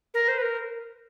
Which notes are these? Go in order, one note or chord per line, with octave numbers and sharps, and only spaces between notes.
A#4
C5
B4
A#4